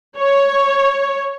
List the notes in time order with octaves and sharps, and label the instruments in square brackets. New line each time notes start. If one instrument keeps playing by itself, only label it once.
[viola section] C#5